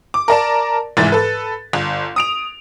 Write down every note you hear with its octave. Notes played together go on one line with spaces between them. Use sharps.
D6
A#4 D5 A5
F1 G#2 E3 E5 A6
A4 B4
G1
D#6 D7 F7